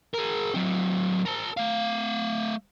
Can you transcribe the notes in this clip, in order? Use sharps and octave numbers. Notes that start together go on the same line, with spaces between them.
G#4 A#4
F#3 C4
A#4 A5
A3 F5